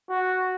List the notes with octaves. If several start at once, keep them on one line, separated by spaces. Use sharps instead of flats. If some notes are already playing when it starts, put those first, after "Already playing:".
F#4